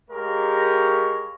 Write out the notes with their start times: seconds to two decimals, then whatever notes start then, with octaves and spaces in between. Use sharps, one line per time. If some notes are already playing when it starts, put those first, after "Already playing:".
0.10 G#3 G4 A#4 C#5 F5